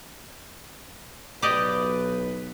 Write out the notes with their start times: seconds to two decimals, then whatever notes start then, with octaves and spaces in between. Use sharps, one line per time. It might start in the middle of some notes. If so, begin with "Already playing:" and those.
1.42 B1 G4 B4 D5 D#5